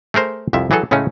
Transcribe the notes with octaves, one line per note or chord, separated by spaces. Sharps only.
A3 G#4 A#4 C5
C2 F2 F3 E5
E3 F#3 G#4 A4
A2 C#3 G#3 A3 C#4